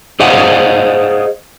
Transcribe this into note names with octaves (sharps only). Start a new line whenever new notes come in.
G#4 C5 D#5 F5 F#5